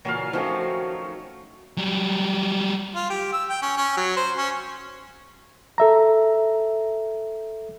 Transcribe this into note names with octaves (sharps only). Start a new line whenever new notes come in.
A#2 C#3 E3 F#3 F5
D#3 F3 A3 C4 C#4 D#4 F#4
F#3 G3
F4
G4
E6
G5
C#4
C#4
F#3
C5
C#4
A4 E5 A#5